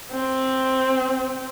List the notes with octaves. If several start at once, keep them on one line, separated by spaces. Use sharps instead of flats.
C4